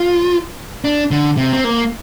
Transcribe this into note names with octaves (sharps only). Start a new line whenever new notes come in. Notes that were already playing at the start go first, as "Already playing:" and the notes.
Already playing: F4
D4
D3
C3
C4
A#3